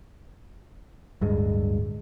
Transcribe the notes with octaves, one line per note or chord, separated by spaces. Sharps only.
D1 G2 G#3